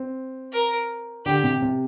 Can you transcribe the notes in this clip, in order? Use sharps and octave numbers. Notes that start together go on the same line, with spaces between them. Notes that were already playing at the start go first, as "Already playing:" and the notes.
Already playing: C4
A#4
D3 G4
C3
C3